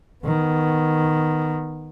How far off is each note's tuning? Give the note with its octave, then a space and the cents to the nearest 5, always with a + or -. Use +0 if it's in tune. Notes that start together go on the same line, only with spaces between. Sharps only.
D#3 +0 B3 +0